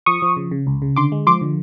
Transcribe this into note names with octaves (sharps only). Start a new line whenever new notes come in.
F3 C#6 D#6
F3
C#3
C#3
C#2
C#3
D3 C6 D6
G#3
F3 C6 D6
D3